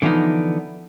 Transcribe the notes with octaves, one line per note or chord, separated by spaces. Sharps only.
D3 E3 F3 B3 D#4